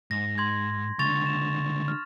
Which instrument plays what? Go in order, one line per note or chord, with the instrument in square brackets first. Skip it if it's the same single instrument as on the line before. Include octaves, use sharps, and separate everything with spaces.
[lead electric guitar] G#2 [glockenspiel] A#6
[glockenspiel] C6 G#6
[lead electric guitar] C#2 D3 [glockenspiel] C#6 A6 F7
[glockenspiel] E7
F6